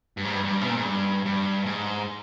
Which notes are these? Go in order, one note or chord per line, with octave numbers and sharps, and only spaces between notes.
G2
G#2
G2
G2
B2
A#2
G#2
G2
G2
G#2